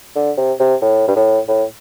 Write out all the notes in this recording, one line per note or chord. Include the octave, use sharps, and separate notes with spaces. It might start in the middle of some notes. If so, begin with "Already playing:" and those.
D3
C3
C3
A2
G2
A2
A2